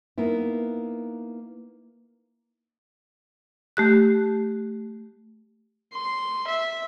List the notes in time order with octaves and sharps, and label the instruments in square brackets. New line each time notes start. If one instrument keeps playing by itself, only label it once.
[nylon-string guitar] A#3 B3 D#4 E4
[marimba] A3 G4 F#6
[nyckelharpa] C6
E5